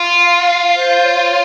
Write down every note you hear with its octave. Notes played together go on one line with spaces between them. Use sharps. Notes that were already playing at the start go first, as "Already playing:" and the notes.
Already playing: F4
F5
F5
C5
C#5